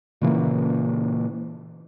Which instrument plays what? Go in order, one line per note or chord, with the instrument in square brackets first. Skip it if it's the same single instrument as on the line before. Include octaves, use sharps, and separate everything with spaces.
[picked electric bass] A#2 C#3 E3 A#3